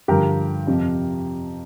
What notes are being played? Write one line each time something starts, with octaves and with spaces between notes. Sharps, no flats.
G2 D3 F3 G4 A#4
F2 C3 F3